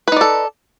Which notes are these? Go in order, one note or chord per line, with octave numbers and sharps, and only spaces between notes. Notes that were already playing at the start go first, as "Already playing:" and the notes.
D#4 A4 B4 D5